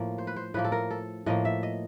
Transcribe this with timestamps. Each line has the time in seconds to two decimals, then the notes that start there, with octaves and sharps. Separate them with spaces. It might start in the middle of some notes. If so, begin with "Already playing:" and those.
Already playing: A2 F3 A#3
0.18 C5
0.27 B4
0.36 C5
0.54 A2 F3 A#3 B4
0.64 A4
0.72 A#4
0.90 A4
1.26 A2 F3 A#3 D#5
1.45 E5
1.63 D#5